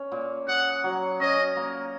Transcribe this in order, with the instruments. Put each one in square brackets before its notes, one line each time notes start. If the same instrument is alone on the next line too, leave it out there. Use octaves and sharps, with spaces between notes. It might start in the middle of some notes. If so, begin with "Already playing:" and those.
Already playing: [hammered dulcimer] C#4
A#2
[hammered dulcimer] G#4 [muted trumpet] F#5
[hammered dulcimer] F#3
[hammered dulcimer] C#4 [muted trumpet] D#5
[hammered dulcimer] A#3